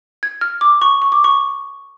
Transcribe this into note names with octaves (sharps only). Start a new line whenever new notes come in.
G#6
F6
D6
C#6
C#6
D6
C#6